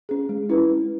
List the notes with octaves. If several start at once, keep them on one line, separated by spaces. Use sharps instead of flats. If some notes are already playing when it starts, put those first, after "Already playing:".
C#4 G#4
G#3
C#4 E4 B4
G#3